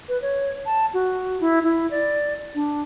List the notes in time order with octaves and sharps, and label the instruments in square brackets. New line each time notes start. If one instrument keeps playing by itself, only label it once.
[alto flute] B4
C#5
A5
F#4
E4
E4
D5
D4